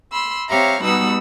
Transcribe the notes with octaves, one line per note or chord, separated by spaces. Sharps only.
B5 C6 E6
C4 G4 C#5 E5 F5 A#5
B2 G3 B3 D#4 F#5 E6